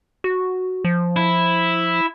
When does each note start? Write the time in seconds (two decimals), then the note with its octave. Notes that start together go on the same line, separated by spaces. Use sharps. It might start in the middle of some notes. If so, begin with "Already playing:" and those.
0.24 F#4
0.85 F3
1.16 E4